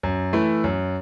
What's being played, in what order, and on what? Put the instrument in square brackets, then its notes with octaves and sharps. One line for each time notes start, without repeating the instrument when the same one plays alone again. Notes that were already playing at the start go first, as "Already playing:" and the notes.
[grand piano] F#2
E3 A3 E4
F#2